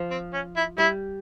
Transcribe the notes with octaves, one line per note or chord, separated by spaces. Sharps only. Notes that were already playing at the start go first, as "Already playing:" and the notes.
Already playing: F3
C4
C#4
E4
G3 E4